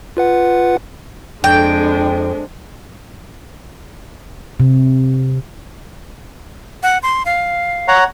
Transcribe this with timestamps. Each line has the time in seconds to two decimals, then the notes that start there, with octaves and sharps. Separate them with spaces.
0.17 F4 B4 F#5
1.44 F2 G#3 D4 G5
4.60 C3
6.83 F#5
7.03 C6
7.26 F5
7.88 C#5 F#5 A#5